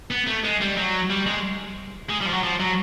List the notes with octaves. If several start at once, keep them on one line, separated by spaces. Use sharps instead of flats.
B3
A3
G#3
G3
F#3
G3
G#3
G#3
G3
F3
F#3
F3
F#3